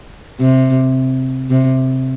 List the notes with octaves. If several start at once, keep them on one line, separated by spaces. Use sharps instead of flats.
C3
C3